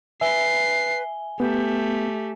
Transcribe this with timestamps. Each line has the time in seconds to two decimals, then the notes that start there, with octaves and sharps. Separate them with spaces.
0.21 B4 E5 G#5 C7 G7
1.40 A3 B3 G4